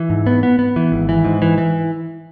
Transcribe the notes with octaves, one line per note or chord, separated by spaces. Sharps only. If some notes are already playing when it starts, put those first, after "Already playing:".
Already playing: E3
G#2
B3
B3
B3
E3
G#1
E3
G#2
E3
E3